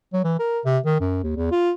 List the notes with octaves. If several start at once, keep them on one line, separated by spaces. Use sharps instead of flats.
F#3
E3
A#4
C3
D#3
F#2
D#2
E2
F4